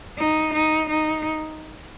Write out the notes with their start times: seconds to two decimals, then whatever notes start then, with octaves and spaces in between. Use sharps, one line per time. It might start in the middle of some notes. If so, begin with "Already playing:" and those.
0.18 D#4
0.54 D#4
0.89 D#4